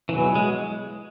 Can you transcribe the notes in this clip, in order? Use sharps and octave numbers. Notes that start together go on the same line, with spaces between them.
E3
B2 F#3 B3 E4 G#4 B4
G#3